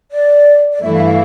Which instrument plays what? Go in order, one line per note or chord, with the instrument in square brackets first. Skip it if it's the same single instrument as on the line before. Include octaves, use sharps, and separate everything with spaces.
[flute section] D5
D5
[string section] G2 E3 A3 E4 [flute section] E5
[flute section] F5
F5